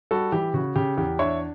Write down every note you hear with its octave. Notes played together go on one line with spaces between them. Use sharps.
G3 F#4 A4
E3 G4
C#3 F#4
C#3 G4
E2 G4
D4 C#5 E5